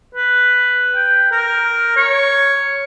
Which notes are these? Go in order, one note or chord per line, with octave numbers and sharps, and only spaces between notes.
B4
G5
A#4
C#5